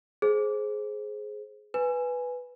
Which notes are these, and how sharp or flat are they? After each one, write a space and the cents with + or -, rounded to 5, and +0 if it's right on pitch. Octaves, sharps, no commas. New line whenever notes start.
G#4 +20 C5 +15
B4 +0 G#5 +0